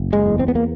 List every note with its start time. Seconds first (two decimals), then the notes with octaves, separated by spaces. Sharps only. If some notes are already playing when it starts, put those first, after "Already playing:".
Already playing: F#1
0.13 G#3
0.26 E2
0.39 C4
0.48 B3
0.55 A#3